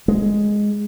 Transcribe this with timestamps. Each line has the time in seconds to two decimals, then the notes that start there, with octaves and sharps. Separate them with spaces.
0.08 G#3